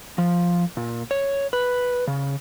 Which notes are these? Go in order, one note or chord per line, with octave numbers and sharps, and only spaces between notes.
F3
A#2
C#5
B4
C#3